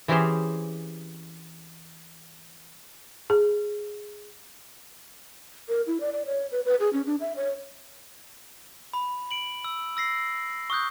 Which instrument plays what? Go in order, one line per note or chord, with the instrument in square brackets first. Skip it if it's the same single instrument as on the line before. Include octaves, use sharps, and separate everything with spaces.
[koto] E3 C4 C#4 G4 G#4 C5
[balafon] G#4
[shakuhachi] A#4
E4
D5
D5
C#5
B4
B4
G#4
C#4
D4
E5
C#5
[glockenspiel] B5
D7 F#7
E6
E6 A#6 C7
C#6 D#6 F#6 G6